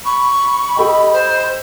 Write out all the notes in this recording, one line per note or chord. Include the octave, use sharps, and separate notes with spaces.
B5 C#6
G4 A4 D#5 G5
C5